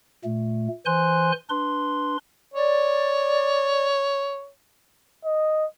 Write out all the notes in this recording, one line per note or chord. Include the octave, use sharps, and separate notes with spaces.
A#2 A3
E3 C5 G#5 C6 F#6
D4 B4 C6
C#5 D5
D#5